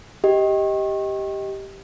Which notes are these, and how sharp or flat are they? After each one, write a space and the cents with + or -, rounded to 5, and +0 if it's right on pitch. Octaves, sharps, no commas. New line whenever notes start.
G4 +0 D#5 +15